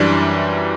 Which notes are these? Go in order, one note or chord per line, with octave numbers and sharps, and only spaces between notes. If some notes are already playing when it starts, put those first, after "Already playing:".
Already playing: F#2 E3 G3 D4